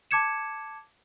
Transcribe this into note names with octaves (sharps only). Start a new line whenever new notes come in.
A5 D6 G#6 C#7 E7